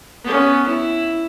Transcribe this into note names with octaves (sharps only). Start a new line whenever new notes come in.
B3 C#4
E4